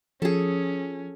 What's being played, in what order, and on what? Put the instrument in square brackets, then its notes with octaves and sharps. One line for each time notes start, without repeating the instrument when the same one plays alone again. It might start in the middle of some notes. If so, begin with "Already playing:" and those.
[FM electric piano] F3 [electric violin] C#4 [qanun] G#4 A4